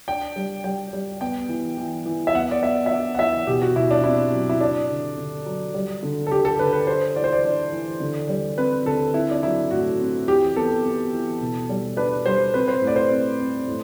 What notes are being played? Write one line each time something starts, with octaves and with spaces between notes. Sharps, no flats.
D4 G5
G3
G3 G5
G3
B3 G5
E3
E3
E3
E5
B3 F#5
D5
B3 E5
E5
D4 F#5
F#5
E3 E5
B2 G4
F#4
B2 E4
D4
C4 E4
F#3
E4
D4
D3
D3
F#3
G3
D3
A4
D3 G4
A4
D3 B4
B4
D4 C5
E3 D5
C5
D5
D4
E3
D3
G3
C4 B4
D3 A4
C4 E4
D4
F#3 E4
A2 F#4
C4
E3 G4
B3 A4
B3
E3
B2
G3
D4 B4
G3 C5
C4 B4
C5
A2
D5
C5
C4
C4
A2